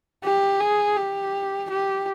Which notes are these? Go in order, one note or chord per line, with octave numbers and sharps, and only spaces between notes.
G4
G#4
G4
G4